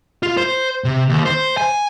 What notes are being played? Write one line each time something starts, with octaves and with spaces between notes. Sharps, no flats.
F4
C5
C3
D#2
C5
G#5